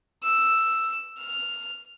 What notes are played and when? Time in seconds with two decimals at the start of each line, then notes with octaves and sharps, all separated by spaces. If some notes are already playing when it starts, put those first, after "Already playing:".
0.23 E6
1.18 F6